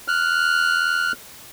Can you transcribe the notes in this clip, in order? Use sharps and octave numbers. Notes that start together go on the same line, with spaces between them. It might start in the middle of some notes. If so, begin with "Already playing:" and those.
F6 F#6